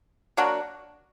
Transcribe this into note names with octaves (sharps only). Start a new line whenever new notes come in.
F#3 A#3 D4 F#4